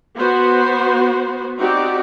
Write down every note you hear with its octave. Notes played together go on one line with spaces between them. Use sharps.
B3 F#4 C5
C4 D#4 F#4 G4 D5